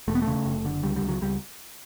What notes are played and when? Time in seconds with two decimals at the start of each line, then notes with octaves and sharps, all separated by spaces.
0.08 E1 A3
0.15 B3
0.22 A3
0.27 C#3
0.46 F#1
0.65 D3
0.83 C#2 G3
0.96 G3
1.02 C#2
1.08 F#3
1.22 C#2 G3